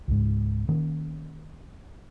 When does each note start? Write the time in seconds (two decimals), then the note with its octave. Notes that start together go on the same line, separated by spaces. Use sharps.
0.08 C#2 G#2
0.69 D#3 A#3 C#4